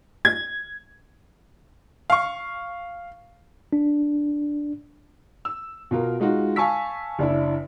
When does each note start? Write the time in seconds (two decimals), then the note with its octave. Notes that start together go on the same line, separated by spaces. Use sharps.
0.25 G#6
2.10 F5 C#6
3.73 D4
5.45 E6
5.91 B2 F4 A#4
6.20 G#3 D#4 F4 F#4
6.56 F5 G#5 A5 C#6 E6 B6
7.19 F#1 D4 E4